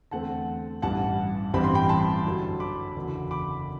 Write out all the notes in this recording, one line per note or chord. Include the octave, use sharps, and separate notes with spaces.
E2 D3 A3 C4 F#5 A5
A1 G2 E3 G3 F#5 A5
A1 G2 E3 G3 C4 B5
C6
G5 B5
A5 C6
F#2 D3 F#3
B5 D6
F#1 E2 D3 F#3
B5 D6